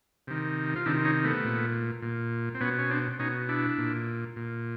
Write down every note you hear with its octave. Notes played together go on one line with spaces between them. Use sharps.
C3 D#3
F4
C3 D#3 D4 E4
C#4 D#4
A3 B3
A#2
A#2
C4
B2 B3 C#4
C#4
C4 D4
B2 C#4 D#4
D4 E4
A#2
A#2